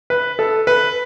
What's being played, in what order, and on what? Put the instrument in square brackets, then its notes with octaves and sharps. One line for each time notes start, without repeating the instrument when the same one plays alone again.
[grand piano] B4
A4
B4